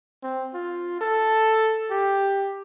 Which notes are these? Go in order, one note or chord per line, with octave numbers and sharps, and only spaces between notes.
C4
F4
A4
G4